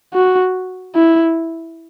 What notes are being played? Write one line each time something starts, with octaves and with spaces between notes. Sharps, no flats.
F#4
E4